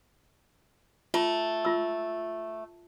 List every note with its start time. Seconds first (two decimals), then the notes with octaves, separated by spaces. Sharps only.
1.14 A3 F4
1.65 F4 E6